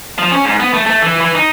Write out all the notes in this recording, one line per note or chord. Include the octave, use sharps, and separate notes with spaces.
F3
C#4
G#2
B3
A3
A3
E3
E3
D#4